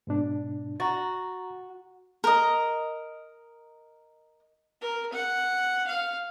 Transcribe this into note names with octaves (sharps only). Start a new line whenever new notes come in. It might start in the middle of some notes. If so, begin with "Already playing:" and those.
G#2 B2 D4
F#4 A#5 A6
A#4 D#5
A#4
F#5
F5